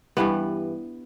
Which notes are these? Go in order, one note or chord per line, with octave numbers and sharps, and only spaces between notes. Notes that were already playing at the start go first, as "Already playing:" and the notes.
G2 E3 G3 B3